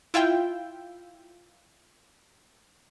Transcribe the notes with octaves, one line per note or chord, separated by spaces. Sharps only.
E4 F4 E5 G5